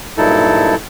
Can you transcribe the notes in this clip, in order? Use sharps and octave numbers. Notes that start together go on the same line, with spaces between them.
G2 A#2 F#3 D#4 E4 A4